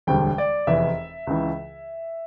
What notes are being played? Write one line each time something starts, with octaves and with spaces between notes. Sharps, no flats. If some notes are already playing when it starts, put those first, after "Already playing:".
E1 D2 D3 G3 G5
D5
F1 E2 E3 E5
C#2 C#3 E3